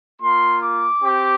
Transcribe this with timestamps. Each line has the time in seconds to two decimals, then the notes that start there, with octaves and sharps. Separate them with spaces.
0.21 A#3 F4 C6
0.62 D6
1.02 C4 G4